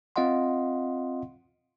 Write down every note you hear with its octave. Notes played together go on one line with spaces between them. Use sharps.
C4 F4 D#5 F5 F#5 C6